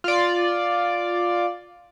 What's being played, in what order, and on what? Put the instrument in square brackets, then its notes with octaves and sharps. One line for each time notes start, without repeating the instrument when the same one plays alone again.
[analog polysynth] F4 D5